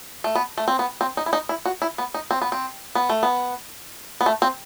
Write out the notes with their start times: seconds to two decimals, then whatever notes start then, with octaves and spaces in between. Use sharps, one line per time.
0.24 A3
0.35 B3
0.58 A3
0.68 C4
0.79 B3
1.01 C4
1.17 D#4
1.26 E4
1.33 D#4
1.49 E4
1.65 F#4
1.82 E4
1.98 B3
2.14 D#4
2.31 C4
2.42 B3
2.52 C4
2.95 B3
3.09 A3
3.23 B3
4.21 B3
4.26 A3
4.42 C4